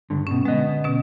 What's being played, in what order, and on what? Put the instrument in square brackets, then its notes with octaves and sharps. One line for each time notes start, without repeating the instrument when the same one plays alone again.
[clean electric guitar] C#2 G2 D3
[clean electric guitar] G2 B2 [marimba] C#4
[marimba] D3 G#3 [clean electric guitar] B3 D#5
[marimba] B2 C#4